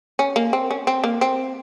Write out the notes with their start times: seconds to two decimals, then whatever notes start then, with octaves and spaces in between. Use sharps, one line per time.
0.19 C#4
0.36 A#3
0.53 C4
0.71 C#4
0.87 C4
1.04 A#3
1.21 C4